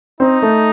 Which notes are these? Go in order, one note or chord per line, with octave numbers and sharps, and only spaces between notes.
C4 D#4
A3